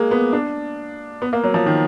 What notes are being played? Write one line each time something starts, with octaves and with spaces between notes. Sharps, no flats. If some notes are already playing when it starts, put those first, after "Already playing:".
Already playing: G#3 A#3
B3
D4
B3
A#3
F#3
F3
D#3